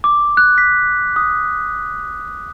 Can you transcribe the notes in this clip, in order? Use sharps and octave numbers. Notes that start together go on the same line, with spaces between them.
D6
F#6
B6
D#6